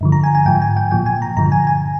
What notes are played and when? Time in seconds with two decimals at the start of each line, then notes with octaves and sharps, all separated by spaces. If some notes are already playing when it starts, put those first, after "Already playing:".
0.01 G2 D3 F3
0.12 A#5
0.24 G#5
0.35 G#5
0.46 G#2 F3 G5
0.62 G#5
0.77 G5
0.91 A#2 F3 G5
1.06 G#5
1.22 A#5
1.37 G2 D3 F3 A#5
1.52 G#5
1.67 G#5